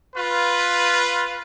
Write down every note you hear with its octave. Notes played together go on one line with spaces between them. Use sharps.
F4 B4